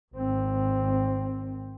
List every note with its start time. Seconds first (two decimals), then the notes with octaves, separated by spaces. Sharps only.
0.15 G#1 C4